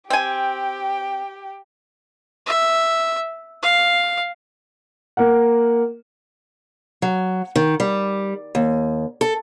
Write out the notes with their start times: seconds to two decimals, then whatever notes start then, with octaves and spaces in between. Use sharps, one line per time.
0.10 C4 G4 G5 G#5
2.46 E5
3.63 F5
5.17 A#3 A#4 F#5
7.02 F#3
7.56 D#3
7.80 G3
8.55 D#2
9.21 A4